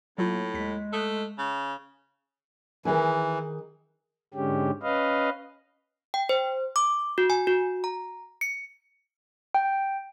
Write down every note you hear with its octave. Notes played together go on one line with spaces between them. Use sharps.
A2 F#3 A#3 F4
D#2 G#3 B6
A3 D#6 F#6
C#3
D#3 E3 G#4 G#5
G#2 D3 G#3 C#4 G4
C#4 B4 D#5 F5
G5
C5
D6
F#4
G#5
F#4
A#5
C#7
G5